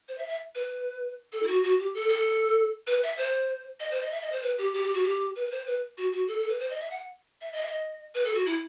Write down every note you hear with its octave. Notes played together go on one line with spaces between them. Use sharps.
C5
E5
E5
B4
A4
E4
F#4
F#4
G4
A4
A4
B4
E5
C5
D#5
C5
D#5
E5
D#5
C5
B4
G4
G4
G4
F#4
G4
B4
B4
C5
B4
F#4
F#4
A4
A4
B4
C5
D#5
E5
F#5
E5
D#5
E5
D#5
B4
A4
F#4
E4